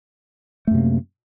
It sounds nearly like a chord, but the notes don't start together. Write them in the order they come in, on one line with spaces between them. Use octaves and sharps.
A3 F#2 C3 A#3